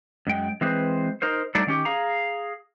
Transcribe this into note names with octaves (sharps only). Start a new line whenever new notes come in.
F#2 G#3 G5
E3 G#3 C4 G#4 B4 C5
D#4 A#4 C5
F#3 G3 A3 D4 D#4 D5
D#3 C#4 G4
G#4 F5 A#5